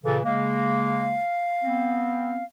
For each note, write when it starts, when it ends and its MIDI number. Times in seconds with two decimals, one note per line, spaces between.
0.04 0.20 46
0.04 0.20 49
0.04 0.20 52
0.04 0.18 69
0.25 1.20 49
0.25 1.20 56
0.25 1.20 58
0.25 2.44 77
1.64 2.40 59
1.64 2.40 60